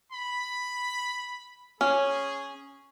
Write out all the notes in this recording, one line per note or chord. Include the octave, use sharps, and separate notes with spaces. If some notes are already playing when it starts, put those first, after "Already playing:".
B5
C#4 G#4